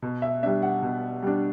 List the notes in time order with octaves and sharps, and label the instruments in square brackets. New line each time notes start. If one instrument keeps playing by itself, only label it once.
[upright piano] B2
E5
G3 D4 E5
F#5
B2
G3 D4